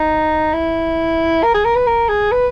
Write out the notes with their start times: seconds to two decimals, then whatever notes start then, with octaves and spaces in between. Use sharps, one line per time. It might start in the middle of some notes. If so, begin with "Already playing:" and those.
Already playing: D#4
0.53 E4
1.43 A#4
1.54 G#4
1.65 A#4
1.75 B4
1.87 A#4
2.09 G#4
2.31 B4